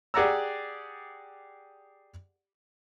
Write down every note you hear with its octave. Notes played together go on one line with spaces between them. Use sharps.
G4 G#4 D5 F#5 A#5 E6